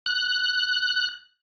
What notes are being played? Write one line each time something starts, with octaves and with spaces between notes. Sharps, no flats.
F#6